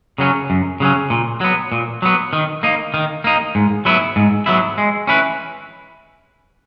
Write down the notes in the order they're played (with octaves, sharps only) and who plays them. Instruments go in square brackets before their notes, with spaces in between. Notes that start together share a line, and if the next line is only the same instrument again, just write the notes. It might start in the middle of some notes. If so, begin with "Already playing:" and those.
[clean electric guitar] C#3 F#3 C#4
F#2
C#3 F#3 C#4
A#2
F#3 B3
A#2
F#3 B3
D#3
A#3 D#4
D#3
A#3 D#4
G#2
F#3 B3 E4
G#2
F#3 B3 E4
G#3
C#4 E4 B4